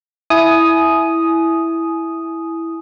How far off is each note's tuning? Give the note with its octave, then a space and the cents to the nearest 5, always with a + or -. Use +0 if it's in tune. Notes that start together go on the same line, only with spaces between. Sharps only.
E4 +0 G#5 +25 D#6 +0